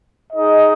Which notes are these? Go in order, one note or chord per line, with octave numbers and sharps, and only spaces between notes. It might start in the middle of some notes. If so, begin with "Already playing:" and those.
D#4 G#4 D#5